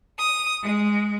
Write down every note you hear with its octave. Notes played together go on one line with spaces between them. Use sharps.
D#6
G#3